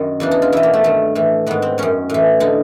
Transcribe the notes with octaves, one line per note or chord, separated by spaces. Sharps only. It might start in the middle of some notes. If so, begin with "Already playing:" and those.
Already playing: F#2 D#3
E2 C#3 E3 D4
D#4
F4
E2 B2 E4
A#3
A3
G2 D#3 A3
A2 E3
G#2 D#3 B3
C4
F#2 D#3 C#4
A2 E3
D3 D#4